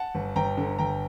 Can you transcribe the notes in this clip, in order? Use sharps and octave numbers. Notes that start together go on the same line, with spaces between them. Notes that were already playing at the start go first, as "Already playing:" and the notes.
Already playing: F#5 A5
G1
G1 G5 A#5
D3
G1 G5 A#5